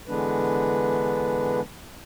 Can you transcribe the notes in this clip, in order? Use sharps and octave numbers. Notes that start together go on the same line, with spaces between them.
D3 E3 G#3 B3 D4 B4